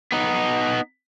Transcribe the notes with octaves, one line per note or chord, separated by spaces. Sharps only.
B3 D#4